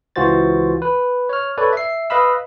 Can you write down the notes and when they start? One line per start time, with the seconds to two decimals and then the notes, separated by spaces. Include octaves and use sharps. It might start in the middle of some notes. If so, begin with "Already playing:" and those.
0.16 C#2 E3 F4 F#4 C5 A6
0.82 B4
1.29 C#5 F6
1.58 A4 B4 C#5 D5
1.73 E5 C7
2.10 B4 D#5 F5 B5 E6